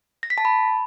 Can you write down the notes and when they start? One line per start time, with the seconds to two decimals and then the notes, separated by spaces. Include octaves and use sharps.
0.23 A#6
0.30 B6
0.38 A5
0.45 B5